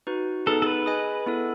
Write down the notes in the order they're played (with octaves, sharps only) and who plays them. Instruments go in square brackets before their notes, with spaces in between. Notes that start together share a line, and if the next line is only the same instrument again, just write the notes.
[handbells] D#4 F#4 B4
[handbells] B3 D#4 G#4 B4 [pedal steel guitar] A4
[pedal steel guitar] A4
B4
[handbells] G#4 D#5 G#5
B3 E4 A4